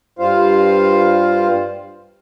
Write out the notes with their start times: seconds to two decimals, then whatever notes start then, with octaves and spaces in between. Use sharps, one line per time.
0.19 G2 G3 F4 C5 F5